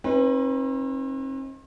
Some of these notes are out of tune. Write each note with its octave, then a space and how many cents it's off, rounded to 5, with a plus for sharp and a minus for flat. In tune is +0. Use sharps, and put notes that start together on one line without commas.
C4 +45 D#4 +20 B4 -10